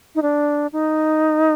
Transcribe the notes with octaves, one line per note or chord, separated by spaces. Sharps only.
D#4
D4
D#4